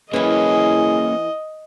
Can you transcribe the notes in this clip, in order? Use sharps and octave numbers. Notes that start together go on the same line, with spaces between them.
E3 A#3 C#4 E4 G#4 D#5